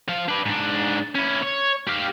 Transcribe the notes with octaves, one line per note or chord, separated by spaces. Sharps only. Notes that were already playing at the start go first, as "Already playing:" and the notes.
F3 F5
D4 B4
G#2 D4
C#4 E4
C#5
G4 F5